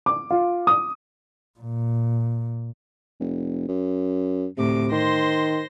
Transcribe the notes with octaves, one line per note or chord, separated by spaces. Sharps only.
D6
F4
D#6
A#2
F1
F#2
D2 A2 C3 D6
D#3 C5 C6 A#6